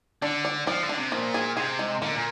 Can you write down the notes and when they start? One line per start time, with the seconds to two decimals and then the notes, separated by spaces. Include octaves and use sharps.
0.22 D3 D4
0.45 D5
0.66 F3 D5
0.83 D3
0.89 D4
0.97 C3
1.12 A#2 F3
1.34 G#4
1.56 C3 G#4
1.79 G#3
2.02 D3 A#3
2.16 A#2